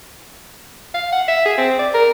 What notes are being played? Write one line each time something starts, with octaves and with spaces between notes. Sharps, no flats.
F5
F#5
E5
G#4
C4
D5
A#4